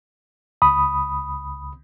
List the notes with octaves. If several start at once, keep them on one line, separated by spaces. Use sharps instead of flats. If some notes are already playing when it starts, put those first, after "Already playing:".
C#2 B5 D#6